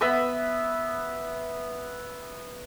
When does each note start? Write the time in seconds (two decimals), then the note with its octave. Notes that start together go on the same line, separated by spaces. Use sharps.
0.01 B3 E5 B5 D#6